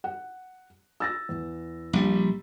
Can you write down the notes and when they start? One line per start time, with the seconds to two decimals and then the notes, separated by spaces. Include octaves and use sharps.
0.04 F#5
1.00 E6 A6 A#6
1.29 E2
1.93 A#1 G3